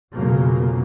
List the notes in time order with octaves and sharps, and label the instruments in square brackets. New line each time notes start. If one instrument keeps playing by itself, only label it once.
[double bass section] F1 B1 C#3 F3 F#3 A#3